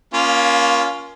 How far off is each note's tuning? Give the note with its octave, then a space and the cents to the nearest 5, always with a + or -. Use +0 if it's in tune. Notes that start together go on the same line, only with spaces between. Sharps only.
A#3 +25 C#4 +15 F4 +0